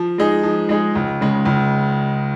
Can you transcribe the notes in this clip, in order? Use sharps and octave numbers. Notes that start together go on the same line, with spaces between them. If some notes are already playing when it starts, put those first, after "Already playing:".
Already playing: F3
G#3 D#4 G#4
F3
G#3 D#4 G#4
C#2
C#3 G#3
C#2